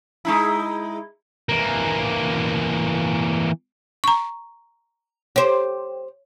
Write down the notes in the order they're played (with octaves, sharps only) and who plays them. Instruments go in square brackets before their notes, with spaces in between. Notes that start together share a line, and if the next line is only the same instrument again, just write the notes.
[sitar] G#3 D#4 E4
[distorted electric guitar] E3 A#3
[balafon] A#5 C#6
[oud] G4 C5 [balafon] C#5